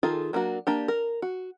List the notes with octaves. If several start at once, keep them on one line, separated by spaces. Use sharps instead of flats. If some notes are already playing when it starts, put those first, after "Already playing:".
D#3 F4 G#4 A4
F#3 A#3 D4 F#4
A#3 D4 G4
A#4
F#4